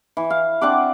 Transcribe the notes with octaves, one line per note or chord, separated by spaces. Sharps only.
E3
F5
C4 D4 F#5 D6